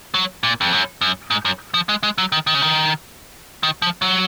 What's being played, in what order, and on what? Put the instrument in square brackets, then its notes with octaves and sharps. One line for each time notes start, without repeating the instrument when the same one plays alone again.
[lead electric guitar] F#3
A#2
F2
F#2
F#2
G#2
F#2
F3
G#3
G#3
F#3
D#3
D#3
C#3
D#3
D#3
F3
F#3